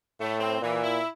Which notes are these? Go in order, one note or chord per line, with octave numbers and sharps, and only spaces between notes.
A2 A3
C4
A#2 E3
E4